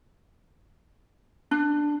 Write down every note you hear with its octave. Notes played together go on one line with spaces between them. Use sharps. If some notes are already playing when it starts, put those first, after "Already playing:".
D4